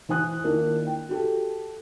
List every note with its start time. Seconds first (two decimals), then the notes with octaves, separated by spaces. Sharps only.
0.09 E3 E4 C5 G#5 D#6 F#6
0.44 D#3 A#3 D4 E4 F4
0.87 G5
1.09 F#4 G4 A4